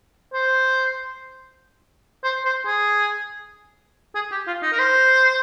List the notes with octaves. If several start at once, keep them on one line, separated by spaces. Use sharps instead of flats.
C5
C5
C5
G#4
G#4
G4
F4
D#4
A#4
C5